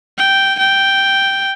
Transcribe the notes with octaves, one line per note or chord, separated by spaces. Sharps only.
G5
G5